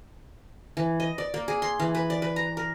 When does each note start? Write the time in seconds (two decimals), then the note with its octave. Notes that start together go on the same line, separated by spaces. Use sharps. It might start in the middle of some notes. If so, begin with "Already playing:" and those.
0.77 E3
1.00 D#5
1.18 D5
1.34 A#3
1.48 G#4
1.62 C6
1.80 E3
1.95 B4
2.10 D5
2.22 B4
2.36 A#5
2.57 A#4